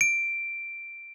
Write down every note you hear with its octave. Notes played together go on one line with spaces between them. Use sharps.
D7